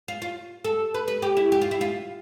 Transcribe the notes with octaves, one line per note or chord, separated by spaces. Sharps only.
F4
F4
A4
B4
B4
G4
E4
G4
F4
E4
F4